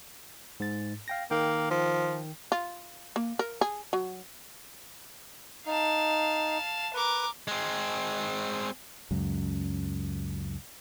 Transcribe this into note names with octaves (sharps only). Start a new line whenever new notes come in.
G#2 A6
F5 G5 A#6
D#3 A#3 G5
F3
F4
A#3
A#4
G#4
F#3
D#4 F5 A5
A#4 B4 D6
G#3 C4
C#2 F#2